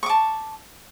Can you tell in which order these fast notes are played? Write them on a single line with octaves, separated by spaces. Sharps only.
C#6 D6 A5